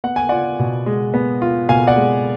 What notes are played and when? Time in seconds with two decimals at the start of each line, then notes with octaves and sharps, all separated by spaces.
0.04 B3 F#5
0.16 G#5
0.29 F4 D5 F#5
0.59 B2
0.86 G#3
1.14 B3
1.42 F4
1.69 B2 F5 G#5
1.87 D5 F#5
1.96 G#3